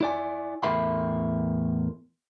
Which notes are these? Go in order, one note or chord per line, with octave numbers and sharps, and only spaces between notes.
E4 D5 G#5
E2 A2 A#4 E5 B5 C6